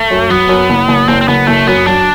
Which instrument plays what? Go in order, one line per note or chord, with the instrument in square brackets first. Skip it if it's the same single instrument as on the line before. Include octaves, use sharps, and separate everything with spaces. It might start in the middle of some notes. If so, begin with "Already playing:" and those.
Already playing: [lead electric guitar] A3
[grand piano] F#2
[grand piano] F#3 [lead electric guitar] B3
[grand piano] F#2
F#1
F#1
[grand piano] F#1 [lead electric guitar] C4
[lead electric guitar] C4
[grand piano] F#1 [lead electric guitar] B3
[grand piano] F#1 [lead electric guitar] A3
[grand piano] F#2 [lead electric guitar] B3
[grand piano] F#3 [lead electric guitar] D4